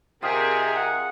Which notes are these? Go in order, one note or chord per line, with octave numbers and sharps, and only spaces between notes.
C3 F4 G#4 A#4 D#5
F#5